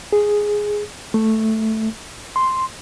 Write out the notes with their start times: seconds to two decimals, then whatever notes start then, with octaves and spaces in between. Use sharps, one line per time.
0.13 G#4
1.14 A3
2.36 C6